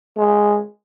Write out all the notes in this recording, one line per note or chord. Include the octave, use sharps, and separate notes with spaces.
G#3